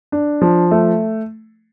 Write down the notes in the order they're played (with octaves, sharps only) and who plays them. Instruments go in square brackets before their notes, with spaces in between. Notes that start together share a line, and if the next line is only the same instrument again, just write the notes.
[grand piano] D4
F3
A3